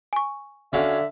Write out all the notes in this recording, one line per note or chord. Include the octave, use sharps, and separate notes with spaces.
G#5 C#6
D3 C#4 F#4 E5 F5